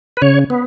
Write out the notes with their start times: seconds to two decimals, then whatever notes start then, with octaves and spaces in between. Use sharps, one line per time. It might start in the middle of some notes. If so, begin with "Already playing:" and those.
0.17 B4
0.22 C#3 C#5
0.50 B3